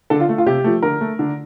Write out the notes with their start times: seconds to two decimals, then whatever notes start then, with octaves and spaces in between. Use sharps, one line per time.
0.10 D3 A4
0.20 F4
0.29 A3
0.38 F4
0.46 C3 G4
0.64 F3 A3
0.82 D3 A#4
1.01 A3
1.19 D3